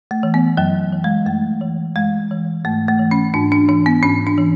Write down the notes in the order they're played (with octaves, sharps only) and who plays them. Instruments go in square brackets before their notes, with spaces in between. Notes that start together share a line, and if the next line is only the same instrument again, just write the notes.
[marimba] A3
E3
B3
F#2 F#3
E3
G#3
F#2 A3
E3
F#2 G#3
E3
G#2 A3
A3
E3
C#4
G#2 D4
D4
E3 D4
B3
G#2 C#4
D4
E3